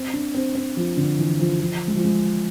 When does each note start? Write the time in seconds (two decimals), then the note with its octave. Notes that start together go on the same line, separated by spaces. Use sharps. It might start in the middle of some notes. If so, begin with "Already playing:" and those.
Already playing: C4
0.13 D4
0.34 C4
0.55 C4
0.77 F3
0.97 D3
1.19 E3
1.40 F3
1.60 F3
1.87 G#3
1.96 F3
2.04 G#3